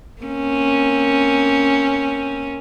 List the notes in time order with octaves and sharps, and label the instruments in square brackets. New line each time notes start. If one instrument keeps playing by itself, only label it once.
[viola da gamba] A#3 C4 C#4